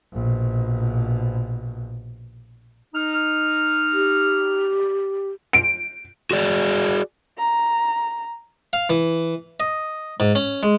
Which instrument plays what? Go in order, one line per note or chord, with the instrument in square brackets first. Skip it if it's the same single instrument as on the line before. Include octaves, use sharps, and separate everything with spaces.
[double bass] A#1 B2
[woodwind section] D#4 F6
[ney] G4
[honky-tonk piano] D7
[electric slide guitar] F#4 G#4 D5
[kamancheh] A#5
[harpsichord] F5
E3
D#5
G#2
C#4
G#3